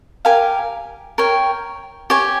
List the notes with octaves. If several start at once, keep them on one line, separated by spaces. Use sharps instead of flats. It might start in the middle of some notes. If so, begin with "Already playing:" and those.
G4 A#4 F5 G#5
A#4 C#5 G5
G4 C#5 G#5